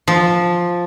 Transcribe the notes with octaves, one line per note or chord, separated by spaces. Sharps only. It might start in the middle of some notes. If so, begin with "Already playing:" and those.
F3